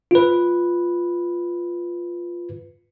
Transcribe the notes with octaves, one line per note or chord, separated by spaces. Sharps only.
F4 B4